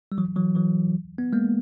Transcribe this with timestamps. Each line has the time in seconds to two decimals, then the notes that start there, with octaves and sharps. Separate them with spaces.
0.12 G3
0.18 E3 F#3
0.36 E3 F#3
0.55 E3 F#3
1.18 B3
1.33 G#3 A#3